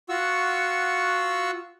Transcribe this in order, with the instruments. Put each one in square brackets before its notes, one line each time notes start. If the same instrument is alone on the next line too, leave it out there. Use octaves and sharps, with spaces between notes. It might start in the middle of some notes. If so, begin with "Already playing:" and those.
[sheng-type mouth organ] F4 F#4 F#5 C#6 E6